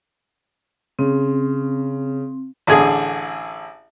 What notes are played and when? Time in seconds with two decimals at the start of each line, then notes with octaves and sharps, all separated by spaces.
0.99 C#3 C4
2.67 A1 D3 G#4